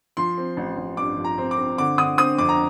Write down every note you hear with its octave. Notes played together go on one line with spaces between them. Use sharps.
F3 C6
C4
A1
A1
G2 D6
F3
A#5
C4
D6
C4
D3 D6
D3 D#6
C4 D#6
F2 D6
A#5